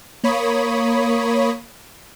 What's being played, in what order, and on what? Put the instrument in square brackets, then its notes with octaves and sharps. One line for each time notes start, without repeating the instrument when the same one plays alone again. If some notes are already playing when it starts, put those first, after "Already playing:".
[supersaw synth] A#3 C#5 B5 D#6